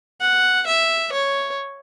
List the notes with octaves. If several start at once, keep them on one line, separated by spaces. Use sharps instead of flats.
F#5
E5
C#5